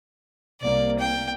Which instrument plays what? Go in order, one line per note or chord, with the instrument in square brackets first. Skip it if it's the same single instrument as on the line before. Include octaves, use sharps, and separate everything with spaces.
[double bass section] C2 A#3 [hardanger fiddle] D5
[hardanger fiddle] G5